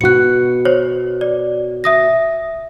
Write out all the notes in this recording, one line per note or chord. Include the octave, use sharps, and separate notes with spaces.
B2 F#4 F#6 C#7
C5 C#5
D5
E5 D#6 A#6